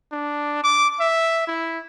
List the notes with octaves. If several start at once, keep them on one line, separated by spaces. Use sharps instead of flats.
D4
D6
E5
E4